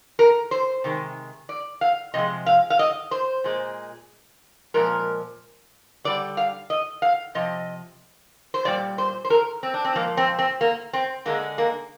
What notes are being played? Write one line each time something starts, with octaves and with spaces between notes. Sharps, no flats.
A#4
C5
C3 D#3 G#3
D5
F5
C3 F3 G#3 D#5
F5
F5
D#5
C5
A#2 G#3
A#2 F3 G#3 A#4
D3 G3 D5
F5
D#5
F5
C3 F3 D#5
C5
A#2 G3 D5
C5
C5
A#4
C4
D4
C4
A#2 F3 G#3 A#3
C4
C4
A#3
C4
D3 G#3 A#3
A#3